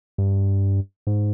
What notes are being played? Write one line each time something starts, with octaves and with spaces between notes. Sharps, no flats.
G2
G#2